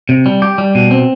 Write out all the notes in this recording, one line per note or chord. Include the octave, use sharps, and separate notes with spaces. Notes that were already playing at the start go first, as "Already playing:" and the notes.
C3
G3
G4
G3
B2
C4